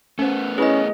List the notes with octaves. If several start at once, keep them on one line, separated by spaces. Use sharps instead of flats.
A3 B3 C#4 C5
C#4 E4 G#4 B4 D#5